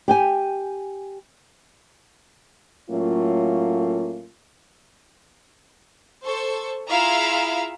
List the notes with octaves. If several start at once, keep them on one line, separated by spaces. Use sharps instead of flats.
G4 G5 G#5
A2 F#3 A3 A#3 C#4 F4
A4 C5 C#6
E4 F4 G#4 E5 F5 A#5